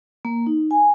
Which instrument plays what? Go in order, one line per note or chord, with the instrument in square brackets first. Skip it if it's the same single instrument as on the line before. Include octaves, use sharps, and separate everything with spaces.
[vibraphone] A#3
D#4
G#5